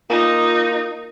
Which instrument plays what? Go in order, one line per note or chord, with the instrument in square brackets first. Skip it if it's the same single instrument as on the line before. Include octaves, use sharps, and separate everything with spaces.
[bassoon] A#3 [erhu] D#4 [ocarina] F4